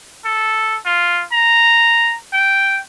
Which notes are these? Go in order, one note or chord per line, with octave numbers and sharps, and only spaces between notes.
A4
F4
A#5
G5